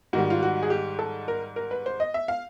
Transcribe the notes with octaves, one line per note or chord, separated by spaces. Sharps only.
G#2 D#3 G3 F#4
F4
F#4
G#4
G4
A4
A#4
A#4
B4
C5
D#5
E5
F5